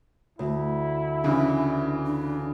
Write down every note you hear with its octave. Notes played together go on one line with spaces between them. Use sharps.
D2 E4
C#3 E3 D4
D4